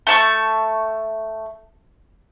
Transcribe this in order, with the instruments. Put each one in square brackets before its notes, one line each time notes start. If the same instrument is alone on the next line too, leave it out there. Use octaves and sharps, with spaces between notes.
[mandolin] A3 A5 C#6